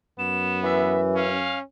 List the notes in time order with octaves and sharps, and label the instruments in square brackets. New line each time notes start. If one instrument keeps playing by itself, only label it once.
[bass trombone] F#2 [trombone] B3 [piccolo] E7
[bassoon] E3 [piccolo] E5
[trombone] C#4 [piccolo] F5